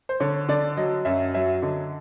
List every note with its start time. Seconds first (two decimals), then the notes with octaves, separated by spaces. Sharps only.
0.09 C5
0.20 D3 C#5
0.49 D3 D5
0.77 F#3 D#5
1.05 F#2 E5
1.34 F#3 E5
1.62 D3 D#5